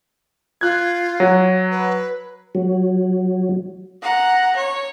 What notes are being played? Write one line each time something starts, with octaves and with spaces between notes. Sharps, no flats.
F4 F#6 G#6
F#3
B4
F#3
F#5 A#5
C#5